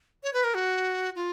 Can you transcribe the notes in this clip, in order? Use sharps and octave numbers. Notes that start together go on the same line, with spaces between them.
C#5
B4
A#4
F#4
F4